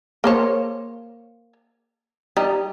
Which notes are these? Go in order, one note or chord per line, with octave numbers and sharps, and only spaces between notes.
A#3 C5 C#5
G3 D#4